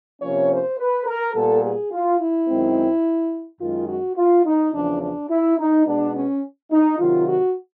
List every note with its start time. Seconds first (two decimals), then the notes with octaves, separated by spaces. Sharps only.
0.22 C3 F3 A#3 C#4 C#5
0.50 C5
0.78 B4
1.06 A#4
1.34 A#2 G3 B3 A4
1.63 G#4
1.91 F4
2.19 E4
2.48 F#2 D#3 G#3 C4
3.60 F#2 D#3 G#3 F4
3.88 F#4
4.17 F4
4.45 D#4
4.74 E2 C#3 F3 D4
5.02 D4
5.30 E4
5.58 D#4
5.86 B2 G#3 B3 D4
6.14 C#4
6.72 D#4
6.99 C3 D#3 F#3 F4
7.27 F#4